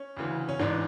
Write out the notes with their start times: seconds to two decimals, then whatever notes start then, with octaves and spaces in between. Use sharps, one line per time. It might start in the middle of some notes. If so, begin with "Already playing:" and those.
Already playing: C#4
0.17 D2 C#3 E3
0.49 C#4
0.59 A1 G#2 E3 D4